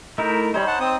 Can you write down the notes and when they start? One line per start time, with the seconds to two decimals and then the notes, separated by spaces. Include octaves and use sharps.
0.18 A3 D#4 E4 A#4
0.54 G3 D#4 C5 C#5 B5
0.67 F#5 A5
0.80 C4 D#6